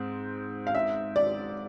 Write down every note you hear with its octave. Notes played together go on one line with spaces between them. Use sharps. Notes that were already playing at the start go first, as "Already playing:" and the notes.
Already playing: G#2 C4
F5
E5
D5